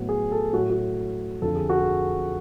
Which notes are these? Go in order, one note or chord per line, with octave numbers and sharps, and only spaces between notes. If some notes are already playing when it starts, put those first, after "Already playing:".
Already playing: A2 F#3 B3
G#4
A4
A2 F#3 A3 F#4
F#4
F2 D3 F3 A4
G#4
F#4
G#4